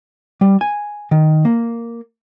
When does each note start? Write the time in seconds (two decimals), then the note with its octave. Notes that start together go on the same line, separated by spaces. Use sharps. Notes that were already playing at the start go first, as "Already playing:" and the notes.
0.41 G3
0.61 G#5
1.11 D#3
1.45 A#3